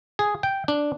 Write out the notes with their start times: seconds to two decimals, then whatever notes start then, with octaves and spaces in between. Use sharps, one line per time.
0.19 G#4
0.43 G5
0.68 D4